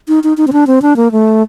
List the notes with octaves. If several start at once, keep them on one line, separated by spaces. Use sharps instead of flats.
D#4
D#4
D#4
C4
D4
C4
D4
A#3
A3